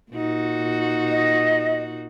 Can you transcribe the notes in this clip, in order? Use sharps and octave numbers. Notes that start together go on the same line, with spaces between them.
A#2 D#4 F#4
D#5